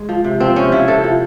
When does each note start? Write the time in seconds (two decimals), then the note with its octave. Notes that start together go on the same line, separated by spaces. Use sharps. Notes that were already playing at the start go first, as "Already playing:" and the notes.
Already playing: G#3
0.09 F3
0.24 C3
0.40 F3 C4
0.56 C3 C#4
0.72 F3 E4
0.88 C3 A4
1.04 F3